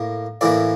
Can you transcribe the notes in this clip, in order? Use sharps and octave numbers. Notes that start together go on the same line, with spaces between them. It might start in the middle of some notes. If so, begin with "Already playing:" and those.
Already playing: A2 A#3
A2 E3 A#3 D5